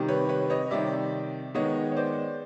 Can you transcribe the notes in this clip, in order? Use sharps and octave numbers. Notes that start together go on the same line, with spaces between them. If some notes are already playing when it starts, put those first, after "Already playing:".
Already playing: C3 D#3 G3
B4 C#5
B4 C#5
C#5 D#5
C3 D#3 G3 D5 E5
D#3 G#3 B3 C#5 D#5
C#5
C5 D5